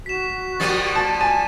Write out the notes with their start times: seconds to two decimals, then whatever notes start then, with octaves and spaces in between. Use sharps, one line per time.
0.06 F#4 B6 E7
0.60 F3 G3 A#3 A6 D#7
0.96 A5
1.21 G#5 A5 D#7